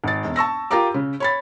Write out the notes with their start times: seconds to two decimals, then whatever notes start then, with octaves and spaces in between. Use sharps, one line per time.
0.04 G#1 A6
0.24 E1
0.36 A5 C#6 E6 A#6
0.71 F4 G4 A#4 A#5 D6
0.94 C#3
1.20 C#5 B5 A6